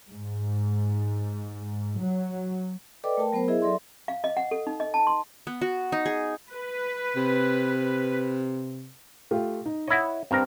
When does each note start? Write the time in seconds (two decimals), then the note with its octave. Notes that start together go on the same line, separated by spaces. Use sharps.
0.11 G#2
2.00 F#3
3.04 A4 B4 D5 D#5 G5 D6
3.17 A3 A#4 G5 A5
3.33 F#3 B3 A#4 C5
3.48 E4 G#4 D#5 E5
3.62 F#3 A4 D5 E5 C6
4.08 F5
4.24 D#5
4.37 F#5
4.51 A4
4.67 D#4
4.80 D#5
4.94 A5
5.07 C6
5.47 B3
5.61 F#4
5.92 D#4
6.06 G#4
6.53 B4
7.16 C3
9.31 A3 F4 G4
9.66 D#4
9.88 E4 C#5 D#5 F#5
10.31 G2 C4 A#4